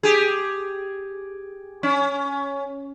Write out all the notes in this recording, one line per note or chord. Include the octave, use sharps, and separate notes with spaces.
G4 G#4
C#4